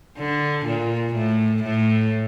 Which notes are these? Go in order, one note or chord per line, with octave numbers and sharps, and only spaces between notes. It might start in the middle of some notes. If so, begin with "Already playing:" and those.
D3
A#2
A2
A2